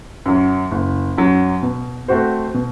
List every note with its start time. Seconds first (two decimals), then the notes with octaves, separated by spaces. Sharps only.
0.26 F#2 F#3
0.71 F#1
1.17 F#2 F#3
1.63 B2
2.08 A3 C4 F#4 C5
2.54 B2